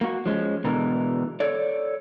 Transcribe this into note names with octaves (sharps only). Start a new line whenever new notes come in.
A#3 F#4
F3 G#3 C#4
B2 D3 E3 G#3 A#4
A4 C#5 D5